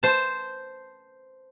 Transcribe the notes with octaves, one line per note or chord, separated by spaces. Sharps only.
C5 A5